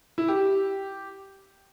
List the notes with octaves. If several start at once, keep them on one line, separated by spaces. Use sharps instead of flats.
E4
G4